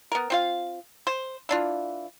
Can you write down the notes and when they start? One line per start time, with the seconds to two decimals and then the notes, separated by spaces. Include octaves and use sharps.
0.12 B3 A#4
0.30 C4 F4 F5
1.07 C5
1.49 E3 D4 F4